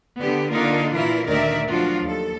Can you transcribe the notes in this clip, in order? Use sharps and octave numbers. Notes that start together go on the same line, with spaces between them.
D3 B3 G4
D3 A#3 D4 D#4 F4 A#4
A#2 E3 E4 F4 A#4
D2 A#2 D#3 A#4 D5 E5
F3 F#3 D4 F4 F#4
D#2 A4